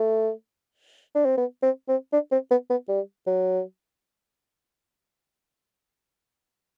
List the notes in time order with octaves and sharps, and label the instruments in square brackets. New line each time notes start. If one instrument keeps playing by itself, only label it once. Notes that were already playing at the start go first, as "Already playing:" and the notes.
Already playing: [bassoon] A3
D4
C4
B3
C4
C4
D4
C4
B3
B3
G3
F#3